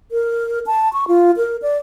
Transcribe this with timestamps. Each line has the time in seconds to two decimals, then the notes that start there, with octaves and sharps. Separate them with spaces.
0.11 A#4
0.66 A5
0.93 C#6
1.08 F4
1.37 A#4
1.62 D5